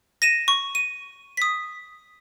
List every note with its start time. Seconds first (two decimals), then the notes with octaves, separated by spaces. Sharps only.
0.22 A#6 D#7 E7
0.48 C#6
0.75 D#7
1.37 D#6 B6